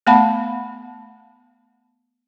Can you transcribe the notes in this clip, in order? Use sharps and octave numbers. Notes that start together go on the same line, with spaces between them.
A3 B3 F5 F#5 A5 B5